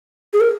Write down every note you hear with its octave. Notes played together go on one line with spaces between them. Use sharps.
G#4
A#4